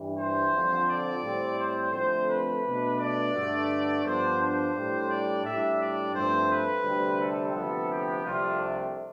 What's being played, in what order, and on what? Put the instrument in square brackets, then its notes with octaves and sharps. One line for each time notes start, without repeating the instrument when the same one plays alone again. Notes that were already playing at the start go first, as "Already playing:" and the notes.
Already playing: [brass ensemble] G2 E3 G3
C5
F2 D3 F3 C4
D5
A2 G3 C4
C5
F2 D3 A3 C4 C5
B4
B2 A3 D4
D5
G2 D3 A3
G2 F3 B3 D4 C5
C5
A2 G3 D4
D5
A2 G3 D4 E5
D5
G2 F3 A3 C4 C5
B4
D2 C3 G3 C4
A4
D2 C3 F3 B3
G4
C2 C3 F3 A3 D4 F4